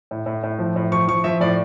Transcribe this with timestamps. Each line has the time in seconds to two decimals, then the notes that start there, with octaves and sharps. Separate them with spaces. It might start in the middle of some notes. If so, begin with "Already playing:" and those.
0.11 A2
0.26 A2
0.43 A2
0.59 F3
0.76 A2
0.92 F3 C#6
1.08 F3 C#6
1.24 F3 E5
1.40 A2 D5